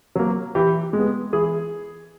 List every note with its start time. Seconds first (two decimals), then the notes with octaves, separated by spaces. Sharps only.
0.16 F#3 A#3
0.55 E3 G4
0.93 G#3
0.98 B3
1.33 E3 G#4